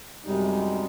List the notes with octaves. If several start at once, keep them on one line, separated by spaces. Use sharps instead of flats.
F#2 C3 G3 G#3 D#4